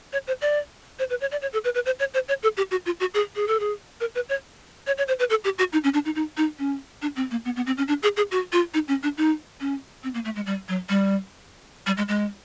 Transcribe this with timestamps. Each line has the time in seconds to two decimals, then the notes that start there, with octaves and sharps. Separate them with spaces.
0.13 C#5
0.27 C5
0.42 D5
0.99 C5
1.10 B4
1.21 C#5
1.32 D5
1.42 C#5
1.53 A4
1.64 B4
1.75 B4
1.86 C5
1.99 C#5
2.14 C5
2.28 C#5
2.43 A4
2.57 G4
2.71 F#4
2.86 F4
3.00 F#4
3.14 G#4
3.36 G#4
3.48 A4
3.60 G#4
4.00 A#4
4.15 B4
4.29 C#5
4.87 C#5
4.98 C#5
5.08 C5
5.19 B4
5.30 A4
5.44 G4
5.59 F#4
5.73 D#4
5.84 C#4
5.94 D4
6.05 D#4
6.15 D#4
6.37 D#4
6.59 C#4
7.02 D4
7.16 C4
7.31 A#3
7.45 B3
7.56 B3
7.67 C4
7.78 C#4
7.88 D4
8.03 G#4
8.17 G#4
8.31 F#4
8.53 F4
8.74 D#4
8.88 C#4
9.03 D4
9.17 D#4
9.60 C#4
10.04 C4
10.14 A#3
10.25 A3
10.36 G#3
10.46 G3
10.69 F#3
10.89 G3
11.87 G3
11.97 G#3
12.08 G#3